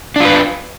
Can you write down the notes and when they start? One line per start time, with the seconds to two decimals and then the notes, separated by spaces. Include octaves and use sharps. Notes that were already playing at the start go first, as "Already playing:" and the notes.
0.16 D4
0.20 F4
0.25 B4